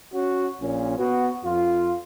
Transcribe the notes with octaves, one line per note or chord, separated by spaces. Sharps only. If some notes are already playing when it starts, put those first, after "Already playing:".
C#4 F#4
A#1 A#2 C#4
B3 F#4
F2 F4